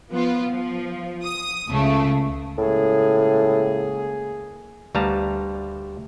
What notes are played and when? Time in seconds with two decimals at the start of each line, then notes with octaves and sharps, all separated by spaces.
0.10 F3 B3 F4
0.50 F3
1.23 D#6
1.67 C#2 C#3 A3
2.58 C#2 A2 A#3 G#4
4.95 D2 G3 B4 F5 A5 A#5